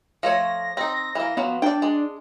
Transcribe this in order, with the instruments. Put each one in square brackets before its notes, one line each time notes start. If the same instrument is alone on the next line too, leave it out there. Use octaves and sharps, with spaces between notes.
[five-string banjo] F3 A3 C#5 [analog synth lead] A#6
[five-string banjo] C4 D#4 [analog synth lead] A#6
[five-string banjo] E3 A#3
[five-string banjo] F3 F#3 [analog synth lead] B3
[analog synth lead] D4 [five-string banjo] D5 G5
[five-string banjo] G#3